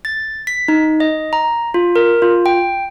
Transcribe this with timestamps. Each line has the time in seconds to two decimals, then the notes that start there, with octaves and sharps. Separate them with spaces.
0.05 A6
0.47 B6
0.68 D#4
1.00 D#5
1.33 A#5
1.74 F4
1.96 A#4
2.22 F4
2.46 G5